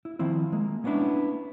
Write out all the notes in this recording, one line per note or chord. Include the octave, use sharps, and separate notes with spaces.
E4
D#3 F3 C4 E4
G#3 A#3
A#3 B3 C#4 D4 E4